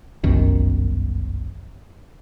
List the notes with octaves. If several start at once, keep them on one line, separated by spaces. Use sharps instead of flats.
G1 C2 F#2 D#3